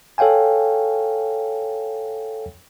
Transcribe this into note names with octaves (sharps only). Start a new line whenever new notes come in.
A4 C#5 F5 G5 G#5